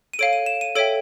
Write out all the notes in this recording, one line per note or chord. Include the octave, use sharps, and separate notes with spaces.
D#7
A4 C#5 F5 D7
D#7
E7
D#7
A4 C#5 E5 G5 D7